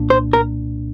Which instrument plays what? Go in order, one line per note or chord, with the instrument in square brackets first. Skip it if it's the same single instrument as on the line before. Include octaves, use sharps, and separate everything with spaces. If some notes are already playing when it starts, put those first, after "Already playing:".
Already playing: [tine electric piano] C2 A#2 A#3 D4
[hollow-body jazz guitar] C5
A#4